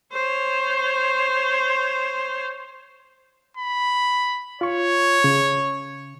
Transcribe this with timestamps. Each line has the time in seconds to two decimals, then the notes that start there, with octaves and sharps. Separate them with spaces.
0.13 C5 C#5
3.57 B5
4.61 F4 C#5 C#6
5.24 C#3